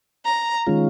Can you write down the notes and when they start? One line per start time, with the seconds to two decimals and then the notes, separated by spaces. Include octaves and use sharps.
0.25 A#5
0.67 D#3 G#3 C#4 F4